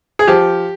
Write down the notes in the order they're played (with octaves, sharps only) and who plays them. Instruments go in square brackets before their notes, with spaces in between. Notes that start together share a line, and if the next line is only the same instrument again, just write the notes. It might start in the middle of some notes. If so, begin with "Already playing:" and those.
[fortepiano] G#4
F3 G4